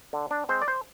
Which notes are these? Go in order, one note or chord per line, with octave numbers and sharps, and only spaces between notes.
D3
D4
G#3 C4 C5
D5
C5